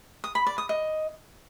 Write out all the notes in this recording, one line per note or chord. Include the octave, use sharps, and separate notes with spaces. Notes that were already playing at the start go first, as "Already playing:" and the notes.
D#6
B5
D5
D#6
D#5